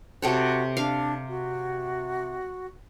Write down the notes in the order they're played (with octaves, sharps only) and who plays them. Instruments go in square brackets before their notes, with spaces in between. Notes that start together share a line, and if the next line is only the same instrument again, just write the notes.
[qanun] C3 A4 C#5 [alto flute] F#4
[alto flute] D4 [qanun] F5
[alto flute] F#4